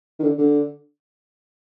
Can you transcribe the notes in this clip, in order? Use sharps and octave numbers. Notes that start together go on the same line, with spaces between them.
D#3
D3
D3